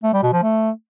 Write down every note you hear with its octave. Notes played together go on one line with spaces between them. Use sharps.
A3
G3
B2
F3
A3